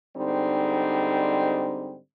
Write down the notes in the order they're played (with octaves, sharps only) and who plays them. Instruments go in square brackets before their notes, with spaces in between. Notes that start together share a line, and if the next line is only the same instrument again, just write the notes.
[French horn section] G#2 D3 G3 C4 D#4